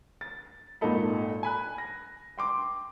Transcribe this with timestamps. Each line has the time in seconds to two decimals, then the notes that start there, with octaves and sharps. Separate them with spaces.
0.21 A6
0.81 G#1 A#2 D#4 A4 B5
1.43 G#5 B5 F#6
1.78 A#6
2.38 G5 C6 D6